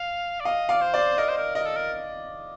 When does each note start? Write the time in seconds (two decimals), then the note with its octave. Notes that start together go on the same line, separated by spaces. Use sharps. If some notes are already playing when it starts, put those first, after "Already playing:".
Already playing: F5
0.40 D5
0.45 D#5 F5
0.69 D5 F5
0.81 C5
0.94 D5
1.18 A#4 D#5
1.28 C5
1.38 A#4
1.55 A#4 D#5
1.66 A4
1.76 A#4